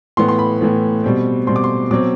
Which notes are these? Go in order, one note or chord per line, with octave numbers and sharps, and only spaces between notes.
A2 E3 B3 C6
C6
B5
A2 E3 B3
B2 G3 C4
B2 G3 C4 C6
D6
C6
B2 F#3 C4 D6